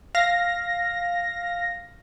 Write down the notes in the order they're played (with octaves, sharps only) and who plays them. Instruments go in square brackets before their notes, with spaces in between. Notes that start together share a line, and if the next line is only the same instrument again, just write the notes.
[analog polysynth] F5 A#6